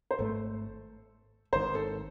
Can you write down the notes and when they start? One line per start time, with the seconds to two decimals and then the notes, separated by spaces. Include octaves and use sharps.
0.11 C5
0.18 G#1 G#2 D#3 A3 A4
1.53 G#1 G#2 D#3 C5
1.75 A4